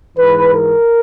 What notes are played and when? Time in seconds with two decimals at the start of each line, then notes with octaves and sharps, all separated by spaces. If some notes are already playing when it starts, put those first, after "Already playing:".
0.17 G#2 E3 B4
0.54 A#4